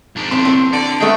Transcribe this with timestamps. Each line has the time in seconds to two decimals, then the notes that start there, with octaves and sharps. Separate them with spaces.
0.16 F2 G#2 D4
0.31 B1 A2 C4 C6
0.45 C4 A4
0.73 D3 D5
1.00 G#3 A3 B3 G5